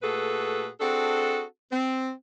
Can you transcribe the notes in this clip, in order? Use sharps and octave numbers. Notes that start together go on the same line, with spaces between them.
A#2 A3 F#4 G#4 A4 B4
C4 D4 F#4 G#4 A4
C4